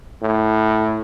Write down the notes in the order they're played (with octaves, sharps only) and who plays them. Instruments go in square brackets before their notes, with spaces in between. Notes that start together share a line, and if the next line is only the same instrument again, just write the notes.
[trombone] A2